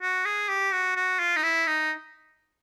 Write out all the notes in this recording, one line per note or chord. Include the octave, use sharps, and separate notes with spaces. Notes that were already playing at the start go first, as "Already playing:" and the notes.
F#4
G#4
G4
F#4
F#4
F4
D#4
E4
D#4